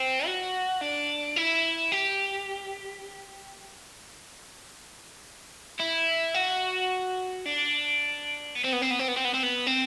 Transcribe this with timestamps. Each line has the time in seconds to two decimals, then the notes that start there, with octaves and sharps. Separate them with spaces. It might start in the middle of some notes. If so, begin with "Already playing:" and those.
Already playing: C4
0.26 F#4
0.81 D4
1.36 E4
1.92 G4
5.79 E4
6.34 F#4
7.46 D4
8.56 B3
8.65 C4
8.73 B3
8.82 C4
8.91 B3
8.99 C4
9.08 B3
9.17 C4
9.25 B3
9.34 C4
9.43 B3
9.67 C4